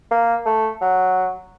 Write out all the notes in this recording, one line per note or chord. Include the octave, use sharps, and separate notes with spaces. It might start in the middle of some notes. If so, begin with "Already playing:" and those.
A#3
A3
F#3